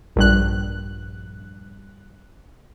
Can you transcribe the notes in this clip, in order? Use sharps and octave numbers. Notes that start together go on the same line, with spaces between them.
A#1 G2 F#6